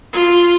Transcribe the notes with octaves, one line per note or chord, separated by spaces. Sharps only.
F4